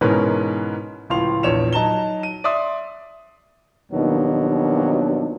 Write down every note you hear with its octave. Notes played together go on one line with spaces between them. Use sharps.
G#2 B2 E3 C#4 A#4 B4
C#2 A2 F3 F5 C6 F7
A#1 E2 C#5 E7 F7
F#3 D#4 A5 A#5 E7 G7
D#7
D5 E5 C6 D#6
D#2 B2 D#3 F3 F#3 D4